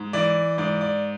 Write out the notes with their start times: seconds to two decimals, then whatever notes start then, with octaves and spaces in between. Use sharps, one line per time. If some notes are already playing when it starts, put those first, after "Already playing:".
Already playing: G#2
0.13 E3 D5
0.58 G#2 D5
0.81 D5